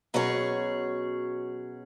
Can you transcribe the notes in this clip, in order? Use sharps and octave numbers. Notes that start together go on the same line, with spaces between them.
B2 F#3 C#4 G#4 C#5